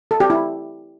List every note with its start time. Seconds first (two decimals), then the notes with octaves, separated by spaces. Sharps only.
0.11 A4
0.20 G4
0.30 E4